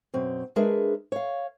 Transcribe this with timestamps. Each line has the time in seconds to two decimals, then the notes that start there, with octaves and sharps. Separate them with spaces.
0.14 F#2 B2 C4
0.56 G#3 D4 G#4 A#4 B4 E5
1.12 C#5 F5